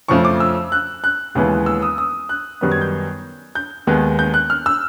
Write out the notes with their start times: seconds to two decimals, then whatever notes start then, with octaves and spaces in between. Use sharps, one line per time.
0.08 F2 C#3 F3 A3 C#6
0.25 D6
0.40 E6
0.72 F#6
1.04 F#6
1.35 D#2 C#3 E3 G#3 B3
1.66 E6
1.82 D#6
1.98 D#6
2.29 F#6
2.61 F#2 D#3 G3 B3
2.72 G#6
2.81 G6
3.55 G6
3.87 D#2 D#3 G#3 B3
4.19 G6
4.34 F#6
4.50 F6
4.66 E6